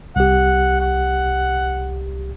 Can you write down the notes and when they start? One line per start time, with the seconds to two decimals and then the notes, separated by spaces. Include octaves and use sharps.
0.16 C2 G4 F#5
0.80 F#5